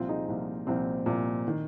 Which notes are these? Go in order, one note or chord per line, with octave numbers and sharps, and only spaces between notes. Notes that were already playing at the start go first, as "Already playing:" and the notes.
Already playing: C2 A#2 F3 C4 F4
D#4 G#4
C2 A#2 F3
C2 A#2 F3 C4
C2 A#2 F3
D#3